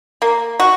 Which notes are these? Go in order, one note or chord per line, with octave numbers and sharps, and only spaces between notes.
A#3
F#4